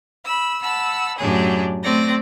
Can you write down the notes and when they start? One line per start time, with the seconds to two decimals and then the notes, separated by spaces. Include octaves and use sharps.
0.24 B5 E6
0.61 F#5 A5 B5 E6
1.17 F#2 A2 D4 G4 G#4
1.82 A3 C4 D5 A#6